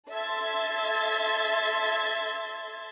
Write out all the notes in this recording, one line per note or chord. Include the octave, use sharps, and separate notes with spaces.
A4 E5 C6 G#6 A6